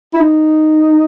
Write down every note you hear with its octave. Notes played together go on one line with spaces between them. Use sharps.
E4
D#4